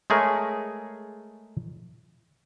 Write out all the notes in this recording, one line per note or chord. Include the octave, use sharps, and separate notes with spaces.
G#3 A3 G#4 A#4 C#5